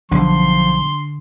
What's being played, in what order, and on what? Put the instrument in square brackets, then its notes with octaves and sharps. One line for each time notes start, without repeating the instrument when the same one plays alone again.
[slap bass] B1 [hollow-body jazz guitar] D3 [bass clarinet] F3 [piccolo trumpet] C6